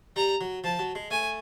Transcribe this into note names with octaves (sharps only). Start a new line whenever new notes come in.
G3 A#5
F#3
F3 A5
F#3
G#3
A3 G#5